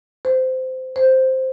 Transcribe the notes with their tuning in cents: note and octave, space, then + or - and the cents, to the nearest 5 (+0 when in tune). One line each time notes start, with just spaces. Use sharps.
C5 -15
C5 +0